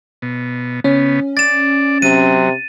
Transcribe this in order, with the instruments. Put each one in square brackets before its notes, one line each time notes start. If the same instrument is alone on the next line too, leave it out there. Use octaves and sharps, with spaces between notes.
[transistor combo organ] B2
[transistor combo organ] C#3 B3 [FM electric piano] C#4
[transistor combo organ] D5 [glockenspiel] A6 E7
[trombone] C3 [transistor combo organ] F#3 [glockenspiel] D#7